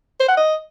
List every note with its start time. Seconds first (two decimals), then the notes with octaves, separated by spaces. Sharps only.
0.20 C5
0.29 F#5
0.37 D#5